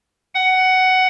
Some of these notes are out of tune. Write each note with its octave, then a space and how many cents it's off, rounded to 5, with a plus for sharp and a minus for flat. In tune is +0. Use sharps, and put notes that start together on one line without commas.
F#5 +15